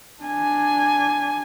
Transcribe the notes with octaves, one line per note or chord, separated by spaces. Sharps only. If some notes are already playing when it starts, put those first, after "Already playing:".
D4 G#5